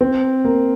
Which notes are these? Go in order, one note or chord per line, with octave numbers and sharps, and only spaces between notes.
C4
A#3